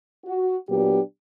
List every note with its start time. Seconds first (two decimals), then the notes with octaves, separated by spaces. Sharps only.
0.25 F#4
0.69 A#2 F#3 B3 D4 G4